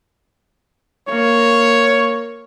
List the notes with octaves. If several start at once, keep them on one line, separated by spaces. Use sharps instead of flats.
A#3 C#5